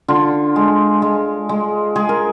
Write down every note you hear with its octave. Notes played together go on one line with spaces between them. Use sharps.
D3 F4
G#3
G#3
G#3
G#3 G#4
A#4